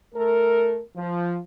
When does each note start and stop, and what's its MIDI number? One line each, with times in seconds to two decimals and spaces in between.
0.15 0.79 57
0.15 0.79 69
0.15 0.79 70
0.96 1.37 53